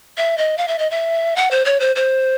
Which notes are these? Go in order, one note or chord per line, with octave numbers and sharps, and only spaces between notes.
E5
D#5
F5
E5
D#5
E5
F#5
C5
C#5
C5
C5